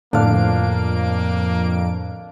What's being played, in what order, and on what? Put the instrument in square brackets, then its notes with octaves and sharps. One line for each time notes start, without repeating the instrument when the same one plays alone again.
[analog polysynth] F2 D7 [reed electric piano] A2 D3 [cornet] A#3 [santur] D4 F5